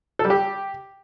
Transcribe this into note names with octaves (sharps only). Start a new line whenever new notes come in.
A4
G3
G4